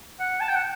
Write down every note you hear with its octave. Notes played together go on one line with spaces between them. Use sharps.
F#5
A5
G5
F#5